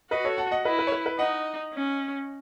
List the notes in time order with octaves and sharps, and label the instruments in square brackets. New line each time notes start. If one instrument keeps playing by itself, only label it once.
[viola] F#4 [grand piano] B4 D#5
[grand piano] A4 C#5
F#5 A5
D#5 F#5
[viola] E4 [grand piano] B4 D#5
[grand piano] B4
C#5
B4
B4
[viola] D#4 [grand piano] D#5 F#5
[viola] C#4